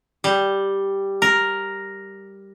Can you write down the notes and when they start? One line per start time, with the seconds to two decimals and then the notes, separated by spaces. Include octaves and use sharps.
0.24 G3
1.22 A#4